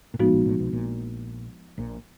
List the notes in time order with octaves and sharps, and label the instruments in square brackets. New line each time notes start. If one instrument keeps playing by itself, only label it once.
[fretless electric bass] A#2
[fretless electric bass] A1 A2 [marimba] F3 G#3 B3 D#4 F#4
[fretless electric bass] A#1 A#2
A1 A2
B1 B2
A#1 A#2
A#1 A#2